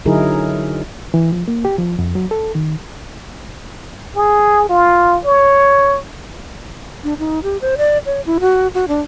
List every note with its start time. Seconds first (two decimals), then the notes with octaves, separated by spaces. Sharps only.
0.06 D3 F#3 D#4 E4 G#4 A#4
1.14 E3
1.33 F3
1.48 A#3
1.65 G4
1.79 F3
1.99 F2
2.15 F#3
2.31 A4
2.55 D#3
4.16 G#4
4.69 F4
5.25 C#5
7.04 D4
7.19 D#4
7.43 G4
7.61 C5
7.78 D5
8.06 C#5
8.26 E4
8.40 F#4
8.74 F#4
8.88 D4